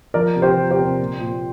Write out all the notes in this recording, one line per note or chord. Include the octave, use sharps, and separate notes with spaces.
F3 A#4 D5
C3
G4 C5
F3
G4 C5
C3
A#2
A#2